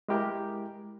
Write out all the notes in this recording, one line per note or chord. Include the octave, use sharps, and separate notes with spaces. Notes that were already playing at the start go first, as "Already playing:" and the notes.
G#3 E4 G4 A#4